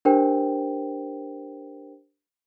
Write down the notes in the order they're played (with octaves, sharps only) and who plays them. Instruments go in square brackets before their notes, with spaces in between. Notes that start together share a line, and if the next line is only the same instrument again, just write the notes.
[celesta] D4 G4 A#4 C5 G5